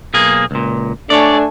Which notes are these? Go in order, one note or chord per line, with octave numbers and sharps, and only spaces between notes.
B1 A#3 G#4
C#2 A#2
A3 D4 C#5 D5 G#5